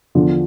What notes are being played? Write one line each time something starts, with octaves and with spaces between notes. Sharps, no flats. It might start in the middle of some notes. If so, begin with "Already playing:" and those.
E2 D3 F3